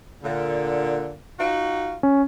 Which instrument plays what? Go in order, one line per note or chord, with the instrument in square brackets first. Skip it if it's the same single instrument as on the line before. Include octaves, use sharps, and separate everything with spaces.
[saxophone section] A#2 D3
D#4 F4 F#4
[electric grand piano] C#4